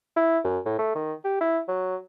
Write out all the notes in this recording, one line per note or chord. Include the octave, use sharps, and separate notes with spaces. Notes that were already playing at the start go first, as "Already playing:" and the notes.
E4
F#2
A2
A3
D#3
G4
E4
F#3